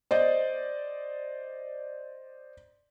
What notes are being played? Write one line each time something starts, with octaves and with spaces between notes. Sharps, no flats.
C5 D5 D#5